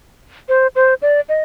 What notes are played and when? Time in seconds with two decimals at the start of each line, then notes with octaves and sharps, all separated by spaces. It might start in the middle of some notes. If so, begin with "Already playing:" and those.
0.49 C5
0.75 C5
1.02 D5
1.29 D#5